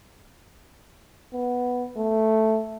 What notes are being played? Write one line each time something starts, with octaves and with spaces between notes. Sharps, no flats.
B3
A3